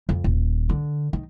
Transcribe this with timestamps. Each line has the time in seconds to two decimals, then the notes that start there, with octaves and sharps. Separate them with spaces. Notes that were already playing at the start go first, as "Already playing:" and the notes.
0.09 F2
0.24 D#1
0.69 D3
1.13 D#3